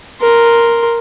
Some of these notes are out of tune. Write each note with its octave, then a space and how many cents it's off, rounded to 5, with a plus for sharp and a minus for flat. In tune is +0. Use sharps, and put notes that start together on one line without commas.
A#4 +0 C6 +0